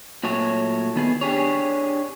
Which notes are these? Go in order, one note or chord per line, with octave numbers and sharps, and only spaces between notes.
A#2 F#3 A3 C#5
D#3 B3 G#4
D4 G4 G#4 C#5